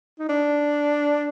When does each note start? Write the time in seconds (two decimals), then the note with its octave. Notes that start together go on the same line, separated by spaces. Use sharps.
0.19 D#4
0.29 D4